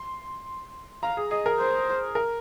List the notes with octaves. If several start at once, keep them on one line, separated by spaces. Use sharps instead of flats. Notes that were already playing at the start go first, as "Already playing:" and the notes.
Already playing: C6
F5 A#5
G#4
G#4 D#5
A#4
C5
A#4